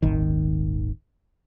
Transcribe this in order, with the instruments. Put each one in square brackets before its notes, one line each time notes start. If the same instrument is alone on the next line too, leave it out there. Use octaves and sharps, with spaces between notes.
[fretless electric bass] D#1 G#1 D#3